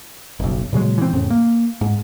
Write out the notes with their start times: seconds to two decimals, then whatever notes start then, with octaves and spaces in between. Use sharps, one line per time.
0.40 F#1 B1
0.73 A#2 C#3 F#3 G#3
0.98 E3 C4
1.13 F2 A2 C#3
1.30 A#3
1.81 G#2